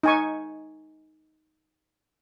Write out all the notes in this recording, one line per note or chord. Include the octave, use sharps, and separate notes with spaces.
D#4 G#5 C#6